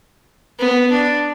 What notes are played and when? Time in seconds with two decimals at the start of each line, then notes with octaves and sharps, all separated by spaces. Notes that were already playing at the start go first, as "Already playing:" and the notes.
0.59 B3
0.91 D4